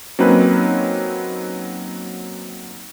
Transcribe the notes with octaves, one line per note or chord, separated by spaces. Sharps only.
F#3 A#3 C4 C#4 D#4 B4